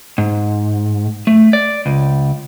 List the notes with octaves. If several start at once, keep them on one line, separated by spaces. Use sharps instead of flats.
G#2
A3
D5
C#2